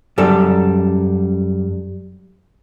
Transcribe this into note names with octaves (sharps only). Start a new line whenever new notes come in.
F#2 G3 A4 D5